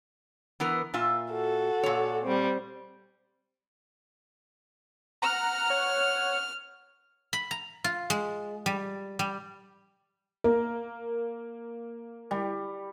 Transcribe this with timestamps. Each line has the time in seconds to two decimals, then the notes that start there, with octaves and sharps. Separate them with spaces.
0.60 E3 B3 A#4
0.94 A#2 F4 E5
1.31 F#4 A4
1.83 A#2 C#5
2.24 G3 C4
5.22 F#5 A#5 F6
5.70 C#5 F#5
7.33 B5
7.51 A#5
7.84 F4
8.10 G#3
8.66 G3
9.19 G3
10.44 A#3 A#4
12.31 G3